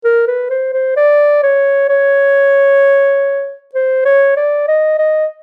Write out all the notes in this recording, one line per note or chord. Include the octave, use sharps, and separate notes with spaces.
A#4
B4
C5
C5
D5
C#5
C#5
C5
C#5
D5
D#5
D#5